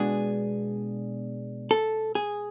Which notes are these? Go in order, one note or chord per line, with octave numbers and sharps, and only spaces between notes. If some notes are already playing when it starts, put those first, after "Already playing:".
Already playing: B2 G#3 B3 D4 G#4
A4
G#4